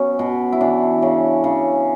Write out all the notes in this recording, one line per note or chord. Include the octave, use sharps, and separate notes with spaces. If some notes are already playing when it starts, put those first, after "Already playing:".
Already playing: F#3 B3 C#4
B2
E4
E3 D4
C#3
C#3